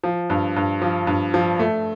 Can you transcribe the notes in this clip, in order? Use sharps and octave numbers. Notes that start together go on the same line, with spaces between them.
F3
G2
G2
F3
G2
F3
A3